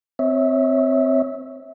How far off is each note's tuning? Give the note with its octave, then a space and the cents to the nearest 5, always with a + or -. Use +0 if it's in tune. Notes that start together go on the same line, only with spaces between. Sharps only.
C4 -10 C#5 +0 E5 -25